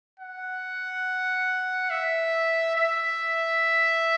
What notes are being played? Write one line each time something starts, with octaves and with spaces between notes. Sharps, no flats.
F#5
E5
E5